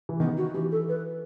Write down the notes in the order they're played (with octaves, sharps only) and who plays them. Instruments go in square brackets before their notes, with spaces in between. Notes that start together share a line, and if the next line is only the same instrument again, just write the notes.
[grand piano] E3
[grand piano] D#3 [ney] B3
[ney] F#4
[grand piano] E3 [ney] G4
[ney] A4
B4